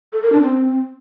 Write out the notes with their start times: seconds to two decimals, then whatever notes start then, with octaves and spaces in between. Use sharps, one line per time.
0.13 A4
0.23 A#4
0.32 D4
0.42 C4